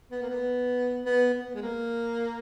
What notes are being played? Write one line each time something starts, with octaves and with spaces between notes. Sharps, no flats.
B3
A#3
B3
B3
B3
G#3
A#3